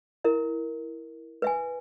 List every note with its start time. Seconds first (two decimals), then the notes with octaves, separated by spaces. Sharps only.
0.24 E4 A#4 E5
1.42 B4 E5 G#5